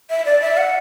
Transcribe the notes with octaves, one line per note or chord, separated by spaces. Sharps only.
E5
D5
E5
F#5